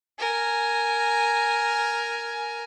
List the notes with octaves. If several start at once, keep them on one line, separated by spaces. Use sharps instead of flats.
A#4 G#5